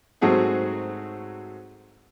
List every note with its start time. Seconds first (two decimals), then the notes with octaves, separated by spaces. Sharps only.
0.21 G#2 F#3 A3 C4 G#4 F#5